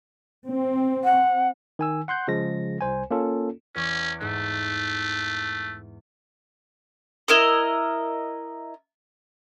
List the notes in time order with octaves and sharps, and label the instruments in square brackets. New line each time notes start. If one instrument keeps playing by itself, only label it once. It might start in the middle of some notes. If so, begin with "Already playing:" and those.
[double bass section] C4
[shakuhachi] F#5
[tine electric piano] D#3 G#5 E6
F#5 C6 F#6 G6
C#3 F3 G#3 A#6
C2 C5 G#5
A#3 C#4 F4 A4
[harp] E2 C#6 D6 [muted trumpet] C#4
[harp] G#2 [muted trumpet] A3
[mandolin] E4 A#4 D#5